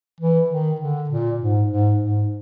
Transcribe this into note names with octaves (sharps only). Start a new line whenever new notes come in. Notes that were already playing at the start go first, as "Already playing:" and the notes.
E3
D#3
D3
A#2
G#2
G#2
G#2